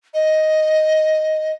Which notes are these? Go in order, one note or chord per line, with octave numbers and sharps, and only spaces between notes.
D#5